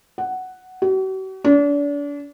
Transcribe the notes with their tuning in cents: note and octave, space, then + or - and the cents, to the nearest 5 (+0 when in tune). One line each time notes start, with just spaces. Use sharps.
F#5 +5
F#4 +45
D4 -35